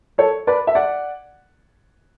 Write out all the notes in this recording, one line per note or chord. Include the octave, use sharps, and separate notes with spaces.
A4 C#5
B4 D5
E5
D5 F#5